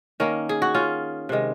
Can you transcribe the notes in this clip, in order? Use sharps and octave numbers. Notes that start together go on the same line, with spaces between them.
D#3 A#3 C#4
G#4
F#4
C#4 F4
C3 D#3 G#3